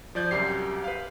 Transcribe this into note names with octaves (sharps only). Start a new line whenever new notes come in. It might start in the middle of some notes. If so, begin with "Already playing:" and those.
F3 D5 G6 G#6
C2 F#2 G4 C7
B4 F5